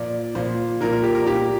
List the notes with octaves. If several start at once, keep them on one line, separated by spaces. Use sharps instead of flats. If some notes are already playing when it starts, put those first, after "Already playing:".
Already playing: A#2 F3 D5
A#2 F3 C5
A#2 F3 A#4
A#4
G4
A#4
A#2 F3 G4